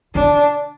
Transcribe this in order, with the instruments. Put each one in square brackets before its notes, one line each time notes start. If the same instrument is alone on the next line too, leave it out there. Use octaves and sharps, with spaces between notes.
[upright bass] D3 [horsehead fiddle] D4